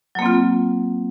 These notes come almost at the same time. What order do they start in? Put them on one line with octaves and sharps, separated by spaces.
F#3 A#3 C4 F4